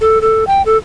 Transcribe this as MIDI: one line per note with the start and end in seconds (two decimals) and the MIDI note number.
0.01 0.21 69
0.21 0.44 69
0.47 0.62 79
0.66 0.77 69